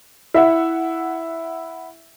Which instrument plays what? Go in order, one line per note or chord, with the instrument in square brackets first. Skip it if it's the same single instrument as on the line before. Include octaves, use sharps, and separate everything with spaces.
[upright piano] E4 E5 F#5